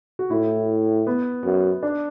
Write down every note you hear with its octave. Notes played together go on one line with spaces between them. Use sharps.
F#4
A2 E4
B3
F#2
D4